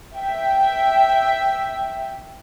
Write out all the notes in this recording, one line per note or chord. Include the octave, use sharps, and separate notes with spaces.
E5 G5